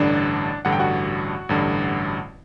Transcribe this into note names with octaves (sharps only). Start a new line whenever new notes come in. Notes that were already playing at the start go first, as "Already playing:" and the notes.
Already playing: A1 G2 D3 D4 D5
A1 G2 D3 F#5
G5
F#4 F#5
A1 G2 D3